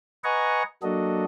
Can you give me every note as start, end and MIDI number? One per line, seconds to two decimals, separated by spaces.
0.24 0.63 71
0.24 0.63 75
0.24 0.63 78
0.24 0.63 80
0.24 0.63 82
0.24 0.63 85
0.83 1.25 54
0.83 1.25 58
0.83 1.25 62
0.83 1.25 66
0.83 1.25 69
0.83 1.25 75